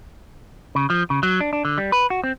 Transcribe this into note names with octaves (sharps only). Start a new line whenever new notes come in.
C#3
F3
C#3
F#3
D4
D4
D3
G3
B4
F#4
C4